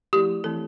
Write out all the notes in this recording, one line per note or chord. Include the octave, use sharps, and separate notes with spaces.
F3 A3 E4 G4
E3 A3 C4 E4 A4